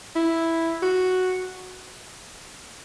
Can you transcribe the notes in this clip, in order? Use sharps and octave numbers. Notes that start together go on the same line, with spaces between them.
E4
F#4